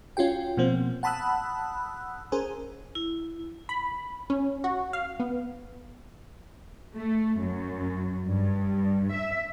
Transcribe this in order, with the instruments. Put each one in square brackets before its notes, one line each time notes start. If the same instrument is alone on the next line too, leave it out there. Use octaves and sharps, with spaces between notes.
[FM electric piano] C#4 F4 F#4 G5
B2 F3 A#3 C4
F#5 A5 B5 D#6 E6 F#6
C#4 G#4 A#4 C5
[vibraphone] E4
[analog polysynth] B5
C#4
F#4
F5
B3
[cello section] A3
F#2
G2
E5